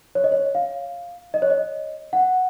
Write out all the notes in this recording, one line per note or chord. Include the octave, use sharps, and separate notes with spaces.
C#5
D#5
C#5
F5
D#5
C#5
D#5
F#5